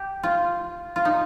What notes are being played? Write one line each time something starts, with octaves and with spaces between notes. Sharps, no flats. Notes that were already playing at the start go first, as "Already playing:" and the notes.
Already playing: G4
F4
F4
D#4